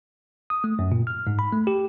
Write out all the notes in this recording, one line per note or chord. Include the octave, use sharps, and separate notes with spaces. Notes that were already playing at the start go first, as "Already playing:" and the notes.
D#6
A3
F#2
A#2
F6
G#2
B5
A3
G4